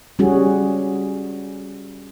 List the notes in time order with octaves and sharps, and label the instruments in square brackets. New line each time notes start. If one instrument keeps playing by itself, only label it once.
[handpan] G3 C#4 F#4 G#4